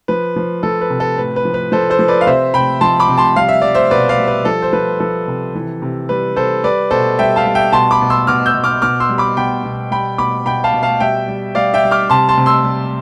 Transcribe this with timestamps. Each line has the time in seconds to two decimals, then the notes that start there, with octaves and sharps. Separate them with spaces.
0.08 F3 B4
0.36 F3
0.63 F3 A4
0.81 B4
0.90 C3
1.00 A4
1.17 A2 B4
1.36 B4
1.45 F3
1.54 B4
1.72 F3 A4 C5
1.90 A4 C5
1.99 F3
2.08 B4 D5
2.21 F5
2.26 C3 C5 E5
2.54 C3 G5 B5
2.81 F3 A5 C6
3.00 B5 D6
3.09 C3
3.17 A5 C6
3.36 G3 F5
3.49 E5
3.62 G3 D5
3.75 C5 E5
3.90 B2 B4 D5
4.09 D5 F5
4.19 G3
4.28 B4
4.45 F3 A4
4.62 C5
4.73 F3 B4
5.00 F3 A4
5.28 C3
5.55 E3
5.82 C3
6.09 G3 B4
6.36 C3 A4 C5
6.63 G3 B4 D5
6.91 B2 A4 C5
7.19 G3 E5 G5
7.36 F5 A5
7.45 G3
7.55 E5 G5
7.73 B2 A5 C6
7.91 B5 D6
8.01 B2
8.10 C6 E6
8.27 B2 D6 F6
8.46 E6 G6
8.55 B2
8.64 D6 F6
8.82 B2 D6 F6
9.00 C6 E6
9.09 G3
9.18 B5 D6
9.37 B2 G5 B5
9.64 B2
9.91 G3 G5 B5
10.18 B2 B5 D6
10.46 B2 G5 B5
10.64 F5 A5
10.73 B2
10.83 F5 A5
11.00 G3 E5 G5
11.28 G3
11.55 G3 D5 F5
11.74 E5 G5
11.83 G3
11.91 D6 F6
12.10 C3 A5 C6
12.29 A5 C6
12.38 C3
12.46 C6 E6
12.65 G3